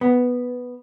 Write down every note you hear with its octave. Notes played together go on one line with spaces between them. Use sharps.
B3